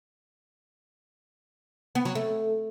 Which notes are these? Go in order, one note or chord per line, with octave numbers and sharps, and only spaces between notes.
B3
F#3
A3